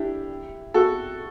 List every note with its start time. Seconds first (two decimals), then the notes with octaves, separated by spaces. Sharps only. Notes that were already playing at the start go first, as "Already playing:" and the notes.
Already playing: D4 E4 G4
0.74 F#4 A4